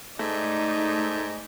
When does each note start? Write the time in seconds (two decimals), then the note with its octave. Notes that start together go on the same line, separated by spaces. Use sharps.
0.19 G#2 A3 D#4 D5